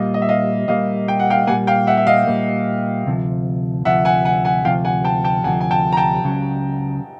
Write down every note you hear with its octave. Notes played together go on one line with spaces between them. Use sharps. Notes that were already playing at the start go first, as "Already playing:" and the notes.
Already playing: A#2 G3 A#3 D#5 F5
D#5
E5
D#5 F5
A#2 G3 A#3 D#5 F5
G5
F#5
F5 G5
A#2 G3 A#3 F#5 G#5
F5 G5
E5 F#5
E5
D#5 F5
A#2 G3 A#3
D2 C3 F3
D2 C3 F3 E5 F#5
F#5 G#5
F#5 G#5
F#5 G#5
D2 C3 F3 F5 G5
F#5 G#5
G5 A5
G5 A5
D2 C3 F3 F#5 G#5
G#5
G5 A5
A#5
G5 A5
C#2 C#3 F#3